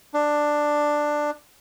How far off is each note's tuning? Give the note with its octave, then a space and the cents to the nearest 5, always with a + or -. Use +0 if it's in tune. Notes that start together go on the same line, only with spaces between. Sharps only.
D4 +10